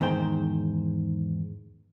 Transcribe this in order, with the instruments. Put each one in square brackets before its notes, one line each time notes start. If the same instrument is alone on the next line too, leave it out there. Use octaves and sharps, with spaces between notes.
[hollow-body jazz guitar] E2 G#2 D#3 C5 G5